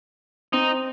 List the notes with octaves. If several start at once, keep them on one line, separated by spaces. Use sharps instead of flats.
C4 D#4